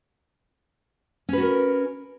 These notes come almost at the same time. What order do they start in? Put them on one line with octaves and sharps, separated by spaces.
C#4 B4 F#4 A#4